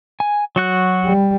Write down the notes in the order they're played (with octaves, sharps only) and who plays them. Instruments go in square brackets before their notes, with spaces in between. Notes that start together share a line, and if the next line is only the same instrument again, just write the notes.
[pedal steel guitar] G#5
F#3 F#4 F#6
[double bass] G3